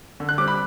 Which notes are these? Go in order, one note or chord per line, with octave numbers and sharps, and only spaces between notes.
D3
F#6
G3 C4 D6
B5